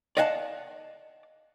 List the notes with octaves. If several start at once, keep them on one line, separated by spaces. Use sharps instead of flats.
D5 D#5 F5 F#5 G#5 A5